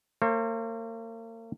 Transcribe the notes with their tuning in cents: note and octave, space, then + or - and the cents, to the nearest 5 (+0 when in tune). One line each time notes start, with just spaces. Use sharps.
A#3 -40 C5 +45